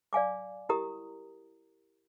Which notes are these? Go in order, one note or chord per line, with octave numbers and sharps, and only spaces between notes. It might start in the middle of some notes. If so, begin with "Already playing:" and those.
D5 F5 G#5 D6
E4 G4 A#4 A#5 D#6